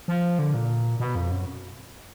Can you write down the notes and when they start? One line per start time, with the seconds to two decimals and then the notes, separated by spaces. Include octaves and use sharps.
0.08 F3
0.39 D3
0.54 A#2
1.00 B2
1.15 F2
1.31 F#2